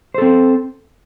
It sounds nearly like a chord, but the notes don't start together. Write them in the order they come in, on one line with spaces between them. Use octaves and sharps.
C5 A4 C4